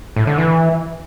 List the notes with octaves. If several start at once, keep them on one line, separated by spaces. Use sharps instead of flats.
A2
D3
E3